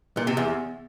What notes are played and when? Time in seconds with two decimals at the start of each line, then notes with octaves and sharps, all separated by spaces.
0.17 A#2
0.27 C3
0.37 E2